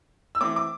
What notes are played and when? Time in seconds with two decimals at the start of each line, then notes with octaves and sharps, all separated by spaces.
0.35 E6
0.41 E3 A3 C4 D6
0.56 D6